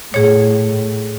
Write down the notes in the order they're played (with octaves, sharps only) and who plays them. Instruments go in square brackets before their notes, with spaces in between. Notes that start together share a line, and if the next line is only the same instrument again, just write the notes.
[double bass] A2 [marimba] G#4 C#5